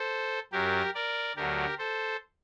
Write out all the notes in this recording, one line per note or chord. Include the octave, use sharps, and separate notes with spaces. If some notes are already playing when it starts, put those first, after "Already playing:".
Already playing: A4 C5
F#2 F#3 G4 A#4
A#4 D5
D2 D3 F#3 G4 A#4
A4 C5